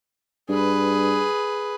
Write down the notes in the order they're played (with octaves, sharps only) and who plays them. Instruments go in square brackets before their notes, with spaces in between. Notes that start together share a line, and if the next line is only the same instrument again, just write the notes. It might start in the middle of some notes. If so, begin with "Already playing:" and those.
[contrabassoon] G2 [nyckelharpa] G#4 B4